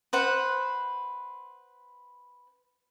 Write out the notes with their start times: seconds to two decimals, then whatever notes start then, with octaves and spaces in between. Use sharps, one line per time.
0.13 B4 C5 F#5